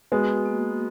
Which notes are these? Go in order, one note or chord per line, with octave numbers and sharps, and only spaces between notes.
G#3 B3 F#4
A#3